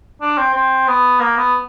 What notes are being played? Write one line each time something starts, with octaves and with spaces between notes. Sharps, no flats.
D4
C4
C4
B3
A#3
B3